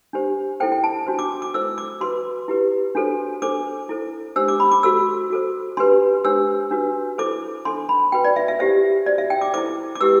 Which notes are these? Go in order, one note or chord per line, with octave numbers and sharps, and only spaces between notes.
D4 G4 C5
E4 A4 C5 G5
G5
A5
D4 F#4 C5
D6
D6
E4 A4 C5 E6
D6
F#4 B4 C6
E4 G4 B4
D4 F#4 A4 C5
D4 A4 C5 D6
E4 A4 C5
D4 G4 C5 E6
D6
B5
D6
F#4 A4 C5 E6
F#4 A4 C5
D4 G4 B4 C6
D4 G4 C5 E6
D4 F#4 B4
E4 A4 C5 D6
D4 A4 C5 C6
B5
F#4 B4 G5
D5
E5
E5
E4 G4 C5 E5
F#4 C5 D5
E5
G5
D6
E4 A4 C5 D6
D6
E4 G4 B4 E6